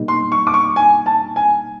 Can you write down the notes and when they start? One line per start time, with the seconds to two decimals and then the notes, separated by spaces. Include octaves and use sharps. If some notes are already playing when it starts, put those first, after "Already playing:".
Already playing: B2 G3 A#3 D#4
0.08 C6
0.32 C#6
0.47 D6
0.54 C#6
0.76 G#5
1.06 A5
1.36 G#5